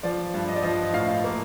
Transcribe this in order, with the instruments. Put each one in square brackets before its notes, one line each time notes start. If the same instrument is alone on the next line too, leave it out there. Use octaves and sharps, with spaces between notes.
[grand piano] F3 D5
G2
D#5
D5
F3 D#5
A2 F5
A#3